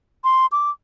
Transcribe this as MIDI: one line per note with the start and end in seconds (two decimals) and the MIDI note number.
0.24 0.46 84
0.52 0.70 86